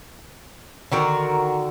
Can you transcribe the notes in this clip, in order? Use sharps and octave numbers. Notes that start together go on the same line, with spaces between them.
D3 D#3 F#4 A#4